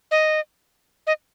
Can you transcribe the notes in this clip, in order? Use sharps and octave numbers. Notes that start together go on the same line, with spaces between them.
D#5
D#5